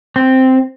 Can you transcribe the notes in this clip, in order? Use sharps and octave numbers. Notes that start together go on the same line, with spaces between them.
C4